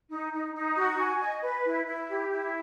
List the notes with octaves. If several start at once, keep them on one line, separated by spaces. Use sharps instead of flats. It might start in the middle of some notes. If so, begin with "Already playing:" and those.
D#4
D#4
D#4
F#4
G#5
D#5
B4
E4
E4
G4
E4